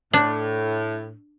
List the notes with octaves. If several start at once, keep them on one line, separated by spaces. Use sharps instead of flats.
A2 D4